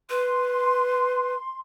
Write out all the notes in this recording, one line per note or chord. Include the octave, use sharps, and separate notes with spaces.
B4 C6